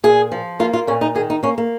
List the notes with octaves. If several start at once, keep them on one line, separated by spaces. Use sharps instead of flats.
A#2 G#4
F3
A#3 F4
F4
A#2 C#4
D#4
D#3 G#4
D#4
A#3 C#4
A#3